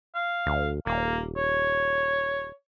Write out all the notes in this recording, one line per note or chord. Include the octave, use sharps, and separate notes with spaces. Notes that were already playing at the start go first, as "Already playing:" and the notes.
F5
D2
D#1 A#3
C#5